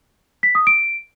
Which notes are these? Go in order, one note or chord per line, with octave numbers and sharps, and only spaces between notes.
B6
D#6
D7